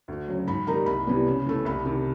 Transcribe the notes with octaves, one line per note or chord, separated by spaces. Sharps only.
D2
C#3 F#3
G#2 B5
D#3 G3 A#3 D#4 A#5
C2 B5
C3 E3 G3 B3
C#3
E3 A3
C2 B5
C3 D#3